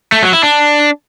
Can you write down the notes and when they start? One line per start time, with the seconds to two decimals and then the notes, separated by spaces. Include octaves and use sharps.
0.12 A3
0.23 F#3
0.33 E4
0.43 D4